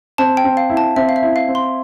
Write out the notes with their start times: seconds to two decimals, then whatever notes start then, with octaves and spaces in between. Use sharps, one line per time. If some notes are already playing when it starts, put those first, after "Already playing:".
0.18 C4 A5
0.37 G5
0.44 C4
0.57 F5
0.70 E4
0.77 A5
0.96 C4 E5
1.09 F5
1.16 E5
1.22 E4
1.36 F5
1.48 C4
1.55 C6